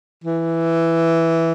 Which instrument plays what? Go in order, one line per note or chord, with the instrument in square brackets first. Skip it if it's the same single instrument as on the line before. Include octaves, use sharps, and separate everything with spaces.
[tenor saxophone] E3